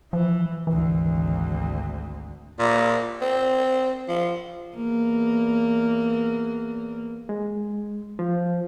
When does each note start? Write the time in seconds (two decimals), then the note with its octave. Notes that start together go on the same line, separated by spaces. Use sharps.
0.13 E3 F3
0.67 G#1 D2 E3
2.59 A#2
3.22 C4
4.09 F3
4.76 E2 A#3
7.29 G#3
8.19 F3